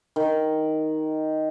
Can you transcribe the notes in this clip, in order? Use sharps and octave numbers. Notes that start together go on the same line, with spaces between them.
D#3